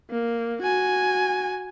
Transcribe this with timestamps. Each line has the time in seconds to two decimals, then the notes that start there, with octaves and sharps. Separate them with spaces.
0.11 A#3
0.62 F#4 G#5